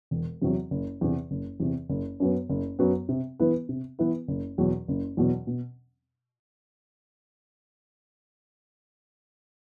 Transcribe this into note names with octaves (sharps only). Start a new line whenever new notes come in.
E1
E2 C3 F#3
F#1
E2 C3
F#1
E2 C3
F#1
F#2 F#3 B3
F#1
F#2 F#3 B3
C3
E3 B3 E4 B4
C3
E3 B3 E4 B4
F#1
E2 B2 F#3
F#1
E2 B2 F#3
B2